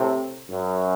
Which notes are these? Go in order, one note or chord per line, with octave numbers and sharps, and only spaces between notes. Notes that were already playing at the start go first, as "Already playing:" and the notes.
Already playing: A2 C3
F#2